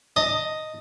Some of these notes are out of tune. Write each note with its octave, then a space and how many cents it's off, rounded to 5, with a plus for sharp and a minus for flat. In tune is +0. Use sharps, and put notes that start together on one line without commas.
D#5 +0 A5 +35